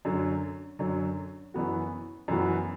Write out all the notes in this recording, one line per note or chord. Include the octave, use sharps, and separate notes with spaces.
F#2 D3 F#3
F#2 D3 F#3
F#2 E3 B3 F#4
F#2 E3 B3 F#4